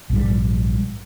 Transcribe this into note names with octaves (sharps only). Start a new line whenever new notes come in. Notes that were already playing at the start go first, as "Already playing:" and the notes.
A#1 G#2 G3